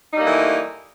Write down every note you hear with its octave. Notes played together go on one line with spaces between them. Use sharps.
E3 G3 A3 A#3 D#4